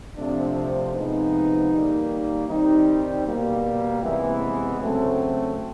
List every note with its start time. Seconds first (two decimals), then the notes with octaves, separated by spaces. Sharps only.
0.17 C3 F3 A3 C4 D4
0.94 C3 F3 G#3 B3 D#4
1.72 D#3 G3 A#3
2.49 D#3 G3 C4 D#4
3.26 B2 G3 A#3
4.03 C3 E3 G#3 B3 E4
4.79 C#3 F#3 A3 C4